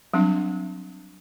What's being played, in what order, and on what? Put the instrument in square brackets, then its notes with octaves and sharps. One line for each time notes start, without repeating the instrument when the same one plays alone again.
[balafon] F#3 G3 C4 D4